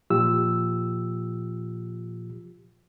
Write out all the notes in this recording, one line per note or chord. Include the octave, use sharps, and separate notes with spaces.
A#2 F3 F4 G4 E6